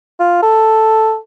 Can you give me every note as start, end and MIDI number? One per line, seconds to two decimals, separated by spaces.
0.19 0.40 65
0.42 1.17 69